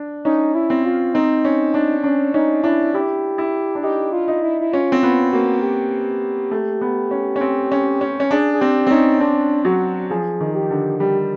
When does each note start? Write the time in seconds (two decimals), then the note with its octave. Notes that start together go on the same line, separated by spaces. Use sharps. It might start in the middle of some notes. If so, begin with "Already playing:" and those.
Already playing: D4
0.25 C#4 D#4
0.55 E4
0.70 C4
0.85 F4
1.14 C4 D#4
1.45 C#4
1.74 D4
2.04 C#4 D4
2.34 C#4 D#4
2.63 D4 E4
2.94 E4 G4
3.38 E4
3.75 D4
3.83 D#4 G4
4.13 F4
4.28 D#4
4.43 E4
4.61 E4
4.73 C#4 F4
4.92 C4
5.02 B3 F4
5.32 A#3 F#4
5.62 G4
6.51 A3
6.81 B3
7.11 C#4
7.36 C#4
7.41 C4
7.72 C#4
8.01 C#4
8.20 C#4
8.31 D4 G#4
8.54 G#4
8.61 C4 G4
8.87 C4
8.91 C#4 D#4
9.20 C4 D4
9.65 F#3 F#4
10.10 F3 G#4
10.41 D#3
10.55 G4
10.70 D3
11.00 G3 G4